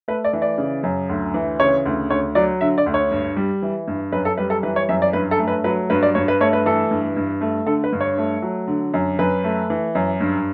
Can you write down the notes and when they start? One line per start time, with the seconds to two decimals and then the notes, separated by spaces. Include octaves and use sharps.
0.08 A3 B4
0.24 D5
0.33 E3
0.42 D5
0.58 C#3
0.83 F#2
1.09 D2
1.34 E3
1.60 C#3 C#5
1.86 D2
2.10 D2 C#5
2.35 F#3 D5
2.61 D3 E5
2.78 D5
2.86 D2
2.94 C#5
3.12 G2
3.37 G3
3.62 E3
3.88 G2
4.12 F#2 B4
4.25 A4
4.38 G3 B4
4.50 A4
4.63 E3 B4
4.76 C#5
4.89 F#2 E5
5.02 D5
5.13 G2 B4
5.31 A4
5.39 A3
5.48 B4
5.64 F#3 B4
5.90 G2 B4
6.03 D5
6.15 G2 C#5
6.28 B4
6.40 A3 C#5
6.53 B4
6.66 E3 A4
6.91 G2
7.17 G2
7.41 A3
7.66 D3 A4
7.84 B4
7.93 G2
8.01 C#5
8.18 A3
8.42 F#3
8.68 D3
8.94 F#2
9.19 F#2 B4
9.44 A3
9.70 E3
9.95 F#2
10.21 G2